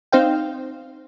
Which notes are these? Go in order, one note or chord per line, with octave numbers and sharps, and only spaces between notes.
C4 D#4 C5 F5 G5